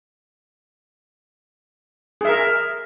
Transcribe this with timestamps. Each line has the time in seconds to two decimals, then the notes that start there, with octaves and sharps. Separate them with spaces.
2.21 G#4
2.25 E5
2.29 A#4